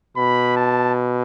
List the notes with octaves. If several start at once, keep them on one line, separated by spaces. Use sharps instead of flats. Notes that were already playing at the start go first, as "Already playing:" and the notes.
B2 B5
A5